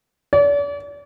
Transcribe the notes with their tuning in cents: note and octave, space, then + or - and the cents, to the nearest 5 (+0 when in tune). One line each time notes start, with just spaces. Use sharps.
D5 -40